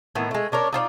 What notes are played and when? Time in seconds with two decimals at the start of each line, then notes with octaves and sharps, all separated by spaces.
0.15 A2 D#3 E3 B3
0.31 G#3 A3
0.52 C#4 D4 A#4 C#5
0.73 D#4 F4 C5 D5